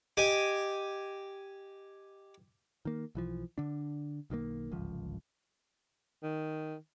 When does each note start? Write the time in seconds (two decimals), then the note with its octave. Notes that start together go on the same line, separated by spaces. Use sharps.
0.17 G4 D#5 G#5
2.85 D#3 A#3
3.15 B1 E3 F3
3.58 D3 D4
4.30 B1 D#3 F#3 A#3
4.71 D1 G#1 C#2 F3
6.23 D#3